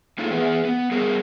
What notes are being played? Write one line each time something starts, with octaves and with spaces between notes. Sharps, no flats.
A3 A#3 D#4 F4 G#4 A4
E3 B3 G#4
B3
G3 B3 G#4 A#4